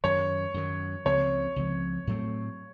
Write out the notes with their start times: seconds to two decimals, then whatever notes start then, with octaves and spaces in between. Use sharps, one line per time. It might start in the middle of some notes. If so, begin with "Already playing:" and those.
0.04 F#2 D#3 F#3 C#5
0.54 F#2 D#3 F#3
1.05 C#2 C#3 F3 C4 C#5
1.56 C#2 C#3 F3 C4
2.07 A2 F#3 A3 C4